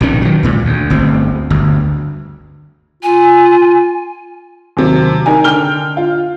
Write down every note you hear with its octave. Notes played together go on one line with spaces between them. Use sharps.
A#1 C3 D#3 C#4
D#3 F#3
C#2 A#2
D2
G1 D2 C4
G1 D2
F4 G#5
D#2 C3 F#3
D#4 A#4 G#5
D3 G5 F6 G6 G7
F4